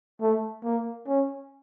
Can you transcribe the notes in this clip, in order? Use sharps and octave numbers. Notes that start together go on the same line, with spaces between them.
A3
A#3
C#4